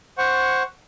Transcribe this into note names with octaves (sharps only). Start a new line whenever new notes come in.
C5 F#5 C#6